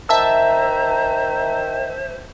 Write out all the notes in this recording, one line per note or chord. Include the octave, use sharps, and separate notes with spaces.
D#3 C5 E5 A5 A#5 E6